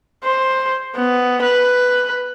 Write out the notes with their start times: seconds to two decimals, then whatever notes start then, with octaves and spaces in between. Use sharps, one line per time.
0.24 C5
0.96 B3
1.42 B4